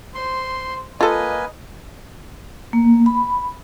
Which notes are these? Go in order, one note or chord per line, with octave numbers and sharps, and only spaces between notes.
C5 C6
A#3 F4 A4 B4 D#5 G#5
A#3
B5